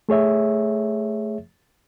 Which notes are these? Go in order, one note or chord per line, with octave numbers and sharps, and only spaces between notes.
A3 G#4 C#5 E5